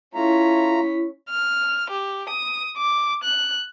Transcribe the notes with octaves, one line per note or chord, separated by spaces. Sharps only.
A3 C#4 E4 F4 A#5 B6
F6
G4
D#6
D6
F#6